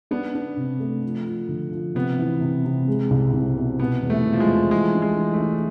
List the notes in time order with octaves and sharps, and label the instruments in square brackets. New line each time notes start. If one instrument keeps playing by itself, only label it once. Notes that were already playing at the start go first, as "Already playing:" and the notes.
[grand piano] B3 [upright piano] D4
[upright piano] D4
C3
A3
F3
F3
D3
F3
[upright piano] C3 [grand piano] B3
[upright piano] E3
C3
C3
G#3
C2
C2
B2
[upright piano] B2 [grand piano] B3
[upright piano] E2
[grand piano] A3
[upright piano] E2
[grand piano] F3
G#3
[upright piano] E2
[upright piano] E3 [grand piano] G#3
[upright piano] D4
[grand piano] G#3
[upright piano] E3
[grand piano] A3
[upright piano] D4